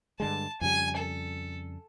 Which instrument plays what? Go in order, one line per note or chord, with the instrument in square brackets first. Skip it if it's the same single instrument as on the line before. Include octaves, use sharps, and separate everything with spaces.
[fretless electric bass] G2 D3 G#3 [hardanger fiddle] A5
[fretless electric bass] F2 C#3 G3 [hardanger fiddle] G#5
[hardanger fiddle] A4